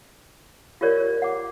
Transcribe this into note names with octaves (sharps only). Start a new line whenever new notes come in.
F4 G4 A#4 C#5 D5
F#5 D6